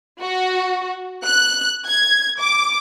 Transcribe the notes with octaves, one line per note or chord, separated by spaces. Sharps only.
F#4
F#6
G#6
D6